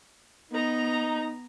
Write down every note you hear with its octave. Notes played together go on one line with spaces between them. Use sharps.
B3 D#4 A#5